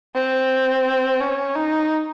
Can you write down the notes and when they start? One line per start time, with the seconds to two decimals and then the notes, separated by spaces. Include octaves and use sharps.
0.15 C4
1.21 C#4
1.56 D#4